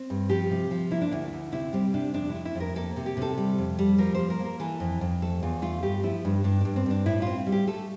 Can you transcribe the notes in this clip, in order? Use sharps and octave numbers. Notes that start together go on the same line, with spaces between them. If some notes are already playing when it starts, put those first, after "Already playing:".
Already playing: C4
G2
F3 G4
C3
F3
A#3 E4
D4
D2 E4
D2
C3 E4
G3 C4
C3 D4
F2 D4
A3 E4
E4
F2 A#4
A#3 A4
C3
G4
C3 A4
G3
F2
G3
F3 A#4
A#3 C5
A#4
A#3
A#4
E3 A4
F2
F2
A3 A4
E2 F4
A3 F4
G2 G4
F3 E4
G2 D4
G2 D4
G2 D4
C4
G2 D4
A2 E4
C4 F4
G3
G4
A3 A4